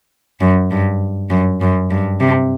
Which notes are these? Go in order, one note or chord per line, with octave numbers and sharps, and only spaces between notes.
F#2
G2
F#2
F#2
G2
C3